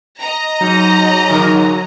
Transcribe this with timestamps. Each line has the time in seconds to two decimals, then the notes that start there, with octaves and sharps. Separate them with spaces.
0.19 D#5 A#5
0.61 G#2 F#3 D#4
1.29 G#2 D3 A#4